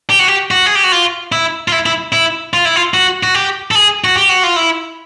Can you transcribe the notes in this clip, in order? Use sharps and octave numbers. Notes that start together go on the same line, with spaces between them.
G4
F#4
G4
F#4
G#4
G4
F#4
F4
E4
F4
E4
E4
E4
F4
E4
F4
F#4
F#4
G4
A4
G#4
F#4
G4
F#4
F4
E4